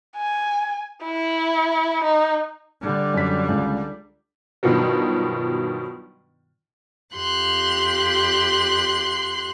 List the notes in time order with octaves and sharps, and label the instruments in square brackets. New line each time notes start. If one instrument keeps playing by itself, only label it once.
[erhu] G#5
E4
D#4
[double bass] D3 G3
[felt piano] F#2 B6
C#2
[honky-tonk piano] G2 B2 D#3 F3 F#3
[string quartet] F2 G4 C6 F#6